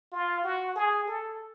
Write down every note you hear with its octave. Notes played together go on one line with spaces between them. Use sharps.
F4
F#4
G#4
A4